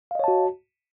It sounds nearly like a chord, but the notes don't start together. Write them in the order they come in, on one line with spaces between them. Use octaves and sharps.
F5 D#5 C#5 A5 F#4